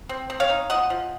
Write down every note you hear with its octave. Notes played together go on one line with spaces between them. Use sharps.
C4
C4
C#5 F5
D#4
F3 D#5 F#5
F3